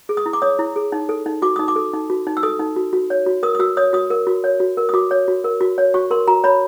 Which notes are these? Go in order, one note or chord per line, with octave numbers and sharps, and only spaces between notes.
G#4
D#6
E4
D6
C#5 D#6
E4
G#4
D#4
A4
D#4
F#4 D6
D#4 D#6
D6
A4
D#4
F#4
D#4
E6
A4 D#6
D#4
F#4
F#4
C#5
F#4
A#4 D#6
D#6
F#4 E6
C#5 D#6
F#4 D#6
A#4
F#4
C#5
F#4
A#4
D#6
F#4 D6
C#5
F#4
A#4
F#4
C#5
F#4 C#6
A#4 C6
F#4 A#5
C#5 B5